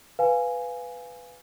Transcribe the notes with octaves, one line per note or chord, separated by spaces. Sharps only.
B4 F5 G#5